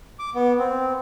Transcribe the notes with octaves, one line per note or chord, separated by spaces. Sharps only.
D6
B3
C4